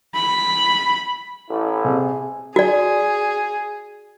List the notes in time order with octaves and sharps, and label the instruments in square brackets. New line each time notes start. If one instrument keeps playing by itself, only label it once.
[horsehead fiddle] B5
[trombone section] A1 E4
[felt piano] C3 [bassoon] G#4
[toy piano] F#4 D5 [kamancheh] G#4